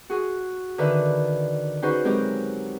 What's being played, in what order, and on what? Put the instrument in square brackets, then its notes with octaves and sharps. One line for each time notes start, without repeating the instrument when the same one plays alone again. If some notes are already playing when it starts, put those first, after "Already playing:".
[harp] F#4 G#4
D3 D#3 B4 E5
C#4 D#4 F#4 G#4 B4 C5
F#3 G#3 C4 G4 A#4